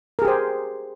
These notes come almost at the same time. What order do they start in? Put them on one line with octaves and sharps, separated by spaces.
A#4 G#4 G4 C5